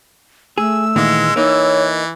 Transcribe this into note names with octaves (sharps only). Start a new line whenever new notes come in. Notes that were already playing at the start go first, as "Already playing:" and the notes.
A3 G#4 E6
A#2 D#3 E3 G#3
E3 A#3 D#4 C#5